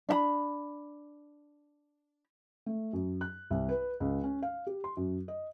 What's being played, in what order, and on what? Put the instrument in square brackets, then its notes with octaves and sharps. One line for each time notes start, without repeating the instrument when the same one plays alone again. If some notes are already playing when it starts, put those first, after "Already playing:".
[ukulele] D4 E5 B5
[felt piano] A3
F#2
F#6
C2
B4
C#2
C#4
F5
G4
C6
F#2
D#5